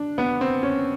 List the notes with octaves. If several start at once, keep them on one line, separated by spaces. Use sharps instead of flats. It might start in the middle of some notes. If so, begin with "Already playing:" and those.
Already playing: D4
B3
C4
C#4